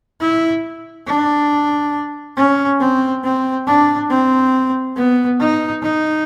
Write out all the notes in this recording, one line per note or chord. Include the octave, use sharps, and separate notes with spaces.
E4
D4
C#4
C4
C4
D4
C4
B3
D#4
D#4